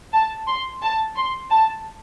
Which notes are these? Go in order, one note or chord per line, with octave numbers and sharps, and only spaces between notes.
A5
C6
A5
C6
A5